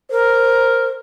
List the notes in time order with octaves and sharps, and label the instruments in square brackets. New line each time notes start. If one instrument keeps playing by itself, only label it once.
[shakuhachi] A#4 [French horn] C5